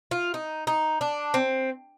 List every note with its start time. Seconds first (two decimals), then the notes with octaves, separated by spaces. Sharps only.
0.11 F4
0.34 D#4
0.67 D#4
1.01 D4
1.34 C4